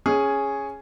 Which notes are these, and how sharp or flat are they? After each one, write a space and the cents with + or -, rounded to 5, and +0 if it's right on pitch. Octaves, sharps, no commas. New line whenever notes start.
C#4 +0 G#4 +0